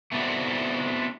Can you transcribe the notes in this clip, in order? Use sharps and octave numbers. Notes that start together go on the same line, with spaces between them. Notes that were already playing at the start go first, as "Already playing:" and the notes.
A3 B3 C4 D4 E4 F#4